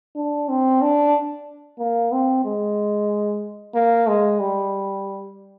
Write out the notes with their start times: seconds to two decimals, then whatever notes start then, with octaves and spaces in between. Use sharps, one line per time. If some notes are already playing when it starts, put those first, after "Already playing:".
0.16 D4
0.49 C4
0.82 D4
1.79 A#3
2.12 C4
2.45 G#3
3.74 A#3
4.08 G#3
4.40 G3